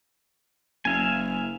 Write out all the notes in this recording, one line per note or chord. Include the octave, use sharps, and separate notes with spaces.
F#1 E5 F5 G#5